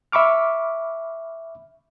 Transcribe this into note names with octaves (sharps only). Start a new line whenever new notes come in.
E5 B5 C#6 D6 F6